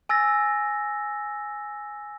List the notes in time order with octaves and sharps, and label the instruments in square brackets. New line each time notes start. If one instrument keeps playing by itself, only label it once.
[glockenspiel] G#5 E6 A6 A#6